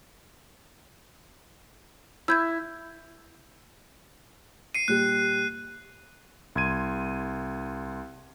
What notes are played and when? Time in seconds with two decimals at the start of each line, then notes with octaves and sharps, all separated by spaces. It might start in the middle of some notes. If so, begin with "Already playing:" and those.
2.28 E4 E6 G6 G#6
4.75 C7 C#7 D#7
4.88 A#2 G3 F#6
6.55 C2 C6 G#6 D#7